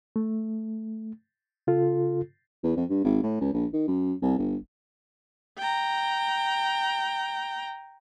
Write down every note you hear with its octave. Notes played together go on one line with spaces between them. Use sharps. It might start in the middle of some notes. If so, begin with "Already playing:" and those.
A3
C#3 F4 A4
E2
F2
G2
G#1
A2
C#2
A#1
D#3
F#2
C2
G1
G5 A#5